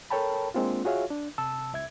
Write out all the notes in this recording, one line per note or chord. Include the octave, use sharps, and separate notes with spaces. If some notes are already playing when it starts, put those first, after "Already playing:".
A4 A#4 C#5 G5 A5 B5
G#3 A#3 C4 D4 F4
F4 F#4 G#4 C#5 E5 F5
D4
C3 A5 E6
C#2 E5 G#6